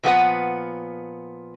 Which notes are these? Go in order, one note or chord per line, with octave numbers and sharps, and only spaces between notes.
A#2 F3 B3 F#4 B4 F#5